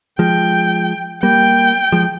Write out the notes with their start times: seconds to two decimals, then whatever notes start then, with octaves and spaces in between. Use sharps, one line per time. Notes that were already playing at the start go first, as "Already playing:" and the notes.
0.19 F3 G#3 G5
1.23 G3 A#3 G5
1.92 F3 G#3